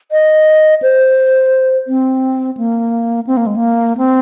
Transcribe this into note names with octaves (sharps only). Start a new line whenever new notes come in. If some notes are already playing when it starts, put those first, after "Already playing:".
D#5
C5
C4
A#3
C4
A#3
G#3
A#3
C4